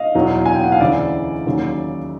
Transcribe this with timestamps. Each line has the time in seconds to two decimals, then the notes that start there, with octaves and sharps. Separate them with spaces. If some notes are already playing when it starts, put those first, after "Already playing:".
Already playing: D#5 F5
0.15 E2 B2 F#3
0.46 G#5
0.55 G5
0.64 F#5
0.72 F5
0.80 D2 C#3 E3 D5 E5
1.46 D#2 C#3 F#3